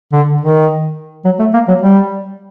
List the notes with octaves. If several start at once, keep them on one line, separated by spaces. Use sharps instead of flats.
D3
D#3
F#3
A3
A#3
F#3
G3